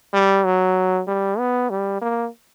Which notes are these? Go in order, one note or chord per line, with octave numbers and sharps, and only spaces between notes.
G3
F#3
G3
B3
G3
A#3